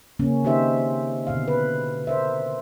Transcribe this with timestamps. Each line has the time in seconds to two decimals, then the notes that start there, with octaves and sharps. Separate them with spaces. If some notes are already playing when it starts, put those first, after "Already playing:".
0.19 C#3 A#3 C#4
0.44 D#3 C4 D#4 G4 C5 E5
1.27 B2 D3 F5
1.48 B4
2.07 A#4 C5 E5